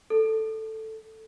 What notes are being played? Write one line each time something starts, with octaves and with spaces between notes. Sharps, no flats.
A4